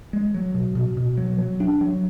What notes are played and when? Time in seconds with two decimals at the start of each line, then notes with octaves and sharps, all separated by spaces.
0.13 G#3
0.34 F#3
0.55 B2
0.75 B2
0.97 B2
1.17 F#3
1.38 F#3
1.60 D4
1.81 F#3